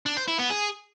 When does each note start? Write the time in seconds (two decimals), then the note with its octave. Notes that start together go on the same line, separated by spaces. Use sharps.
0.06 D4
0.17 C5
0.28 E4
0.39 B3
0.51 G#4